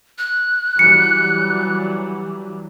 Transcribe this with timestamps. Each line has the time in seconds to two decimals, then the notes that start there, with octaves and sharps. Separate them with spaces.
0.18 F#6
0.79 E3 F#3 G3 C#7